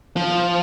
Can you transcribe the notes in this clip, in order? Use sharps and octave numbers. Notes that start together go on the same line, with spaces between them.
F3